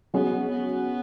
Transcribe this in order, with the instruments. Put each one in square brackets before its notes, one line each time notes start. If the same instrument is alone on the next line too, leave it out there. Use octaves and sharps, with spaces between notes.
[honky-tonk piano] F#3 C#4 G#4 [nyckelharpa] B3
[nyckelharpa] B3